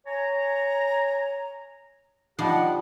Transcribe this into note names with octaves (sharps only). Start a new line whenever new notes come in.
C#5 G#5 A#5
F3 G3 D#4 G4 F#5